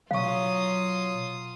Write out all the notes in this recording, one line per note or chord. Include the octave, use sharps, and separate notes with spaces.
B2 F#3 F4 F5 C#6 D#6